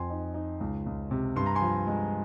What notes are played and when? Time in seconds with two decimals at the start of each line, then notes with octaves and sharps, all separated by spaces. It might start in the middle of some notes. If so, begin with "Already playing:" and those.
Already playing: F2 G#5 C6
0.10 D#4
0.34 D#4
0.60 C#2
0.86 C#2
1.11 C3
1.36 G2 C6
1.46 A#5
1.55 G#5 C6
1.61 F3
1.87 G#3